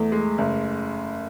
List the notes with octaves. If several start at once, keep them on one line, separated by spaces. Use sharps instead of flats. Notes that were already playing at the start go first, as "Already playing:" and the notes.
Already playing: E2 A3
G#3
F#1